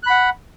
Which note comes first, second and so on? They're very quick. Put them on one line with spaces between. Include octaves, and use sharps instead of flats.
F#6 B5 F#5